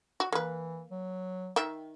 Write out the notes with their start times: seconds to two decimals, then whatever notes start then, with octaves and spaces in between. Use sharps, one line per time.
0.20 F#4
0.32 E3 A#3 B4
0.91 F#3
1.56 D#3 E5 G5